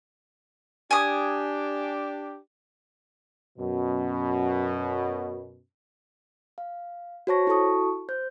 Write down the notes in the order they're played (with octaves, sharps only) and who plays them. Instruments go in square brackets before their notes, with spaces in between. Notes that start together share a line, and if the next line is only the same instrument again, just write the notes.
[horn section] D4 G4 [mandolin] G#5 D#6
[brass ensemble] F#2 B2
[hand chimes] F5
F#4 C5 C#5 A5 C#6 A#6
E4 F#4 A4 A5 C#6 D#6
C5 G6